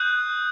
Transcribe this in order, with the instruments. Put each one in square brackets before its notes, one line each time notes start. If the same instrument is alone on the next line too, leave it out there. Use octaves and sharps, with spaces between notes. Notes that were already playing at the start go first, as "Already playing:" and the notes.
Already playing: [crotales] D#6 F#6 G6